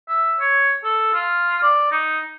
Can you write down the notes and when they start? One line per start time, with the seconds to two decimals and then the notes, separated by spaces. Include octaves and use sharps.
0.09 E5
0.40 C#5
0.84 A4
1.14 F4
1.63 D5
1.92 D#4